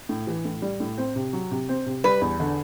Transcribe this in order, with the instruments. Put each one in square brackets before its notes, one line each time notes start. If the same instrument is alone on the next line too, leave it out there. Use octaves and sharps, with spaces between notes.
[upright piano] A2
E3
A2
G3
A2
C4
C3
F#3
C3
C4
C3
[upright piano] G3 [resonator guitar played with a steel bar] B4
[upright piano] E2
D3